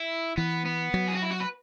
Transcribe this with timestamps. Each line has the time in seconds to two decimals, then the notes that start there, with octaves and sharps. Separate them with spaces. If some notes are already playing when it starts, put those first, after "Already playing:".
Already playing: E4
0.37 E3 B3
0.66 B3
0.94 F#3
1.08 G#4
1.15 F#4
1.22 E4
1.31 F#4
1.41 B4